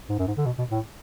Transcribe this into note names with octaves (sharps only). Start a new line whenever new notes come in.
G#2
F#2
G#2
D3
B2
B2
A2